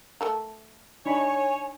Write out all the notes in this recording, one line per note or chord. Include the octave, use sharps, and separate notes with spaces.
A3 A4 A#4
D4 D#4 C#5 G#5 B5